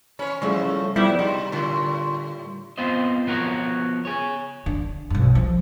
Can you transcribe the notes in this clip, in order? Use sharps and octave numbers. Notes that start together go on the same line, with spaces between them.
C#4 C#5 B5
A2 C#3 F3 G3 A3
F3 G3 B3 E4
C3 D#4
A2 D3
B3 C4 F4 C5 D#5
F3 B3 F#4 A#4 C#5
G#4 C#5
D3
B1 G2
F3